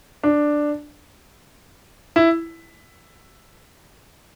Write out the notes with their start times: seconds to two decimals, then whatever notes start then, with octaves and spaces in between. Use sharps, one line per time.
0.24 D4
2.16 E4